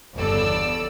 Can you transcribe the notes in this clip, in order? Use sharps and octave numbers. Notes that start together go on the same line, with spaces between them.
G1 E2 C#3 A4 D5 E6